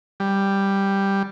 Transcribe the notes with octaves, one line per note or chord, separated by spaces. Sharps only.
G3